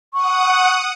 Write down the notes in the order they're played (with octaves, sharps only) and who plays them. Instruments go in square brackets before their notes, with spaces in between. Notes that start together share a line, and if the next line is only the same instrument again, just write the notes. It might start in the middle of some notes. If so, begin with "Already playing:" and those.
[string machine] F#5 D#6 [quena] C#6